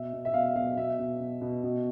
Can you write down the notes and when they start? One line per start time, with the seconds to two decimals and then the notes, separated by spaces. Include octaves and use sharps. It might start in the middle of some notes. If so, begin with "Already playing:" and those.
Already playing: B2 E5
0.13 B2
0.25 E5
0.34 B2 F5
0.56 B2 F5
0.77 B2 E5
0.99 B2
1.20 B2
1.41 B2
1.64 B2